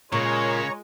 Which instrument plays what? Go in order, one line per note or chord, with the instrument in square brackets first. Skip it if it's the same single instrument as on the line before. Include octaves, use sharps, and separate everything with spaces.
[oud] A#2 [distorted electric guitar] C#3 [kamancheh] G#3 [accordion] C#5 A#5 C#6